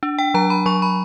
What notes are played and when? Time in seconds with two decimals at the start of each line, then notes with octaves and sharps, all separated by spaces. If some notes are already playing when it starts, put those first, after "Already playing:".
0.03 D4
0.19 G5
0.34 F#3 A#5
0.50 B5
0.66 F#3 C#6
0.82 B5